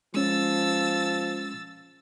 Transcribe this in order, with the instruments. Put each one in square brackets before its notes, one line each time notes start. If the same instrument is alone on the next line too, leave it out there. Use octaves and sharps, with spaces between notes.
[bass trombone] F3 [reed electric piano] G#3 C#4 [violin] E6 A6